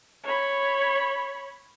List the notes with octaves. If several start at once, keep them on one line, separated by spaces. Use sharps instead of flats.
C#5 B5